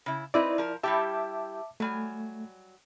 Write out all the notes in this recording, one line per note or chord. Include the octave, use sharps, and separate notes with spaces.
C#3 E4
C4 D#4 E4 B4 D5
F3 A#4
G3 E4 G4 E5 A5 D6
F#3 G3 A3 G#5